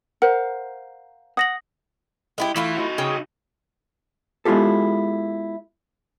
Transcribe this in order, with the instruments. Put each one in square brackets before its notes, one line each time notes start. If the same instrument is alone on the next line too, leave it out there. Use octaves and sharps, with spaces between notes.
[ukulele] A#4 C5 F5 [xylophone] F#5
[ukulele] F#5 [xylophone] D#6 A#6 F#7
[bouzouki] G#3 E4 G4
[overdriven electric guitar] E3 [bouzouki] A3 E4 F4
[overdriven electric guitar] D#4 F#4
[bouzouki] C#3 G#4 G5
[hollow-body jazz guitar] G#3 B3 E4 F4 G4 A4